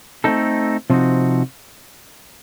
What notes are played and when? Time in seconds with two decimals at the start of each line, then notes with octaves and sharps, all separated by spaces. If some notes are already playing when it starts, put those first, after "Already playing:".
0.24 A3 C4 D#4 A4
0.90 C3 F3 C4 D#4 F#4